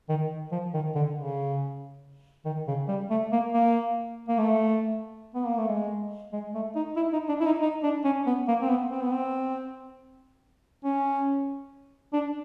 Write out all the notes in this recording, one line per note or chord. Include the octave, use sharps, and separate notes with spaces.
D#3
F3
D#3
D3
C#3
D#3
C#3
G3
A3
A#3
A#3
A#3
A3
B3
A#3
A3
G#3
G#3
A3
D#4
E4
D#4
D4
E4
D#4
D#4
D4
C#4
B3
A#3
C4
B3
C4
B3
C4
C#4
D4